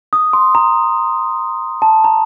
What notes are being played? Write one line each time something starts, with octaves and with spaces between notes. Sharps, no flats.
D#6
C6
A#5
A5
A#5